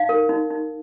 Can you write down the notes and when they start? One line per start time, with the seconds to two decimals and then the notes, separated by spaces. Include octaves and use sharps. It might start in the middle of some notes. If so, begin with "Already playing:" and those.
Already playing: D#4 F5
0.09 A#4
0.29 D#4
0.50 D#4